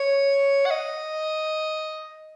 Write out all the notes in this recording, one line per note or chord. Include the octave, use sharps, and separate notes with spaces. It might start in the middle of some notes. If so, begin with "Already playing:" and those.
Already playing: C#5
F#5
D#5